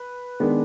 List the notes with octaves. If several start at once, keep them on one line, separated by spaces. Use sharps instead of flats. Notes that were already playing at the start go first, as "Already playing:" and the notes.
Already playing: B4
D#3 G#3 B3 D4